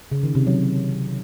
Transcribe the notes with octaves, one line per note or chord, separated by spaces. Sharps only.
C#3
D#3
C3
F#3